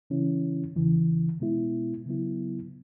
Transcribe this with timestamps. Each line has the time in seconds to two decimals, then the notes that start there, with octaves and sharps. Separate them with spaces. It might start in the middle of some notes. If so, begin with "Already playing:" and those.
0.10 C#3 E3 C#4 E4
0.75 E2 C#3 E3
1.40 B2 G#3 B3 E4
2.06 C#3 F#3 B3 E4